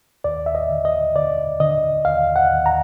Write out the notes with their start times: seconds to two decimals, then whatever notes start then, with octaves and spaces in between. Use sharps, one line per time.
0.24 D#2 D5
0.46 E5
0.55 D#5
0.70 D3
0.85 D#5
1.15 D3 D5
1.60 D3 D#5
2.05 D#2 F5
2.36 F#5
2.51 D#2
2.66 A#5